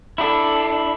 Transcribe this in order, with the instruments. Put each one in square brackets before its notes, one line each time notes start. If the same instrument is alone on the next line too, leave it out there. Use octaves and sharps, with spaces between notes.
[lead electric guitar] D4 E4 [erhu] A4